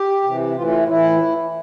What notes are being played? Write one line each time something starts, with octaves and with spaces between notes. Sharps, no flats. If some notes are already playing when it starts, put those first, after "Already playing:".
Already playing: G4
C3 E3
A2 E3 F4
F4
E4
A2 E3 E4